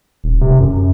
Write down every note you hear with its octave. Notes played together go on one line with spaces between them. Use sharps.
D#1
C3
F#2